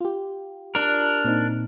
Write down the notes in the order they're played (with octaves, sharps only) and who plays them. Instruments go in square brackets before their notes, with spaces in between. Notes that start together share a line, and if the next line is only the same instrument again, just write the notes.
[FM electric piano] F4 G4
[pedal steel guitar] D4 A#4
[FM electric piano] A#2 C4 D#4